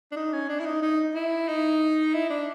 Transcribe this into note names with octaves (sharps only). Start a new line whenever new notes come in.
D4
D#4
C#4
D4
E4
D#4
D#4
E4
D#4
E4
D4